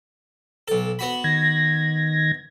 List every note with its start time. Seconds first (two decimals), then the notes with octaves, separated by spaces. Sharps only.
0.68 B1 A4
0.99 B3 F#4 B5
1.24 D#3 G#6 A#6